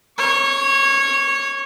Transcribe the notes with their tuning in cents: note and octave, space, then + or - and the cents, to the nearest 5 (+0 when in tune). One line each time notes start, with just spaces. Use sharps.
C#5 -20 C#6 +25